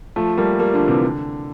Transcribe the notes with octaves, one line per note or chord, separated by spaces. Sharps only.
F3 A3
G3 A#3
G3 A#3
D3 F3
C3 E3
D3